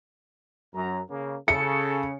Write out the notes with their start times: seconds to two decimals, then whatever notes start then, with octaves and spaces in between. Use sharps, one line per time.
0.74 F#2 A#5
1.10 C#3 A#3
1.48 C#3 A4 C#7